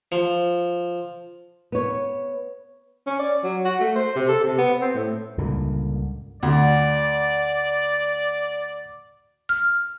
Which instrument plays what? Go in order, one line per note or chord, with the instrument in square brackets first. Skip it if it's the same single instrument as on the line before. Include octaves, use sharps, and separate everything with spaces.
[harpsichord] F3
[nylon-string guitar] B3 C#5
[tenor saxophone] C#4
D5
F#3
F#4
A3
C5
C3
A4
C3
B3
C4
A2
[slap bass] C#2 G2 A#2 D3
[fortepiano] D2 [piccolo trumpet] D5
[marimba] F6